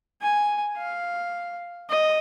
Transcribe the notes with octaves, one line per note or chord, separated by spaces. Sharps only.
G#5
F5
D#5